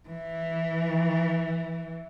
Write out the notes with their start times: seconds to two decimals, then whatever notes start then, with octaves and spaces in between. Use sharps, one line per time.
0.09 E3